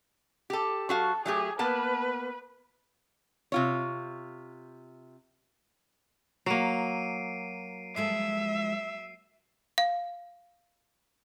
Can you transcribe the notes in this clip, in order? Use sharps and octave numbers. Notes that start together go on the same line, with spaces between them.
G4 A4
F#3 F#4 A4 F5
F#3 A3 G4 G#4
A#3 B3 B4 A5
C3 F4 C#5
F#3 A#3 C7 D7 D#7
F3 G#3 A4 E5 C7
F5